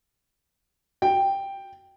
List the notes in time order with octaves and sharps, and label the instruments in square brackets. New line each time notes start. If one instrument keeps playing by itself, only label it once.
[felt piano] G5